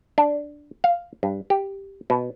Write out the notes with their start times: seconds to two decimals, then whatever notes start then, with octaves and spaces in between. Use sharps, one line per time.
0.18 D4
0.84 F5
1.23 G2
1.50 G4
2.10 B2